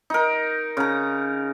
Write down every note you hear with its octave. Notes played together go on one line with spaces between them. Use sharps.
D#4 A#4
C#3 A#5